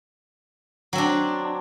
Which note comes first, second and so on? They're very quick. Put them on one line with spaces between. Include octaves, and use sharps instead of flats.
F#3 C4 D4